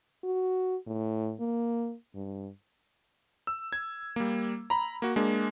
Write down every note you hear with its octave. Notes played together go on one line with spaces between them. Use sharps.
F#4
A2
A#3
G2
E6
G#6
G3 A#3
A#5 B5
A#3 F#4
G#3 A#3 D4